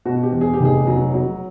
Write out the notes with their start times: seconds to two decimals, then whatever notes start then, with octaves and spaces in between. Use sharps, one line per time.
0.05 B2 F#4
0.23 G4
0.32 E2
0.41 G#4
0.54 G4
0.60 F1
0.65 G#4
0.87 F#3
1.14 F#3